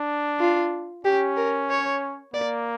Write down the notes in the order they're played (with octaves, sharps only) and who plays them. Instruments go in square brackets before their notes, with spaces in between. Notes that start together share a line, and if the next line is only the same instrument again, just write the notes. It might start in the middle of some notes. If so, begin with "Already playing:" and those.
Already playing: [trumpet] D4
[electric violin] F4
[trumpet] C#4 [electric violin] G4
[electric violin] A#4
C#5
[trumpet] A#3 [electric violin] D5